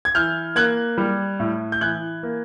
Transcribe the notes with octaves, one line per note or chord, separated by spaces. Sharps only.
G#6
E3 F6 G6
A#3 F#6 G#6
G3
A2
G6
E3 F#6 G#6
A#3